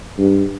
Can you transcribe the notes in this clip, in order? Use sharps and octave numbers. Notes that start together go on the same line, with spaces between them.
G2